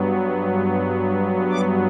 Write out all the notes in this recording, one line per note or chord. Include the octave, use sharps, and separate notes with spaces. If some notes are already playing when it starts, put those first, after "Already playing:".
Already playing: G2 F#3 B3
D6